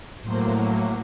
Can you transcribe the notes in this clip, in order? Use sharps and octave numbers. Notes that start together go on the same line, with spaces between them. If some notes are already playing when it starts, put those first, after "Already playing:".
A2 F#3 A#3 C5